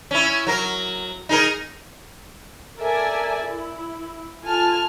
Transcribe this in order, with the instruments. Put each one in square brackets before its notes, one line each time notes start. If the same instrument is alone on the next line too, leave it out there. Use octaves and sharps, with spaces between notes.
[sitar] C#4 E4
F#3 A#4
D#4 G#4 A#4
[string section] A4 A#4 D5 E5 G#5
E4
F4 A4 G#5 A5 F6